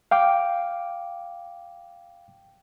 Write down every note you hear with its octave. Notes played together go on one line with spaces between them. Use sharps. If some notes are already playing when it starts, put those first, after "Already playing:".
F5 G5 D6